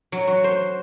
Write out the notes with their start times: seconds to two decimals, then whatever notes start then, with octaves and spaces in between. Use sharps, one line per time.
0.12 F#3
0.27 F#4
0.44 C5